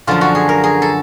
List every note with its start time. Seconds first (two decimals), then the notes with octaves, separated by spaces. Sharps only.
0.07 F#2 D3 F3 F4
0.21 F#4
0.35 G#4
0.49 A#4
0.64 G#4
0.82 A4